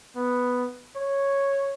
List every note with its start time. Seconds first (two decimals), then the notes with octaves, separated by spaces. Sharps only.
0.16 B3
0.96 C#5